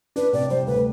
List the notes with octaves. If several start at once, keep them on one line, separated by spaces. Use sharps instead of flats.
D4 B4
C3 D5
G3 C5
D2 B4